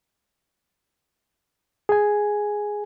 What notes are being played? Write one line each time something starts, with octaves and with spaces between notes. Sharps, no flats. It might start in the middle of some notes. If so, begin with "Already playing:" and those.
G#4 G#5